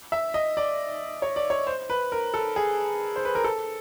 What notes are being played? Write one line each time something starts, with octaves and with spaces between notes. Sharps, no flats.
E5
D#5
D5
C#5
D5
C#5
C5
B4
A#4
A4
G#4
C5
B4
A#4
A4